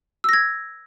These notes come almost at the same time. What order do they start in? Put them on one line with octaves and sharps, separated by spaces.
E6 A#6 G#6